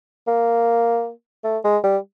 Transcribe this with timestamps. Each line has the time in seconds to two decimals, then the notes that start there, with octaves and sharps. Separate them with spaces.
0.27 A#3
1.44 A3
1.64 G#3
1.83 G3